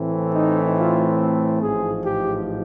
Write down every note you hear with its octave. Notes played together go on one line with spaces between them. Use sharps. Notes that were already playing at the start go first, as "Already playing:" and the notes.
Already playing: A2 E3 A3 C4
D#4
F4
A1 G#2 F3 G#4
G4